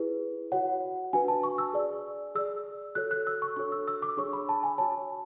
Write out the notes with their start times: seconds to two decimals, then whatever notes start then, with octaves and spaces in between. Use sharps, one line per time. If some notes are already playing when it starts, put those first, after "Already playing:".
Already playing: E4 G#4 B4
0.52 F#4 C#5 F#5
1.13 D4 F#4 B4 G#5
1.28 A5
1.43 C#6
1.58 E6
1.73 G#4 D5
2.35 G#4 D5 E6
2.95 F#4 A4 C#5 F#6
3.11 F#6
3.27 E6
3.42 C#6
3.56 D4 F#4 A4 C#5 C#6
3.72 E6
3.88 E6
4.02 D6
4.17 D4 G#4 C#5 C#6
4.33 B5
4.49 A5
4.63 G#5
4.78 F#4 C#5 A5